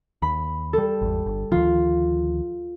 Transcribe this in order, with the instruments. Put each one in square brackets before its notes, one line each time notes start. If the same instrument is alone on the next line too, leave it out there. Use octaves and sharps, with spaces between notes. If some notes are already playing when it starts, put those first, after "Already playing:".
[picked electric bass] D#2 [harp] B5
[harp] G3 A4
[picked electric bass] G#1 E2
G1
[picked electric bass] D2 D#3 F3 [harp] F4